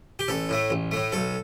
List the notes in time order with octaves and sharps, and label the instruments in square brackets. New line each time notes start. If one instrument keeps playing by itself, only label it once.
[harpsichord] G4
A1 A4
A2 A3
A1
A2 A3
B1 A4